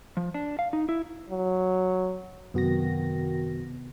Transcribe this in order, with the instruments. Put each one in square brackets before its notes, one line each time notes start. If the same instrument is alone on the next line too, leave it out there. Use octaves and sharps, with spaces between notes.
[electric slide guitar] F3
D4
F5
D#4
E4
[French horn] F#3
[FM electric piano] F#2 F#4 A#6 [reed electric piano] C3 B3 [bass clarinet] D#3